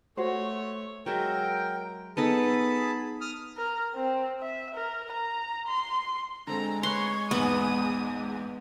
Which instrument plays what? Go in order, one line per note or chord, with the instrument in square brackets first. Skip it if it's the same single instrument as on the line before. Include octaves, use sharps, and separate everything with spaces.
[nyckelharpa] A3 C#5 [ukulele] F#4 C5
[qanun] F#3 G#3 E5 [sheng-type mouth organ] A#4 G5
[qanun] B3 D#4 A4 [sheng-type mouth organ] G#4 A5 B5
[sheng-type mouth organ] D#6 F6
[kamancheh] A#4
C4
E5
A#4
A#5
C6
[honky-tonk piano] D3 C4 A4 [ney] G#3 [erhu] A#5
[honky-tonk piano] B4 B5 F#6 [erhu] C#5 [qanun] C6
[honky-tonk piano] A#1 E2 G#2 [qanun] B3 [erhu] D#6